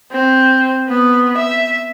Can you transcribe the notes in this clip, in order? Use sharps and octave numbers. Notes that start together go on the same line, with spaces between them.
C4
B3
E5